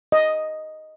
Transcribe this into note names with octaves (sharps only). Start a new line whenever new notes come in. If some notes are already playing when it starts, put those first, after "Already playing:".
D#5